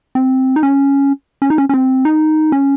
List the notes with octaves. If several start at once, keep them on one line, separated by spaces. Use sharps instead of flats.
C4
D#4
C#4
C#4
D#4
C#4
C#4
C4
D#4
C#4